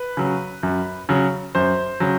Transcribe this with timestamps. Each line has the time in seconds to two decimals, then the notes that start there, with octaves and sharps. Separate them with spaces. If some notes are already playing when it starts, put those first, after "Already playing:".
Already playing: B4
0.17 C#3 F#3
0.63 F#2
1.09 C#3 F#3
1.55 F#2 C5
2.00 C#3 F#3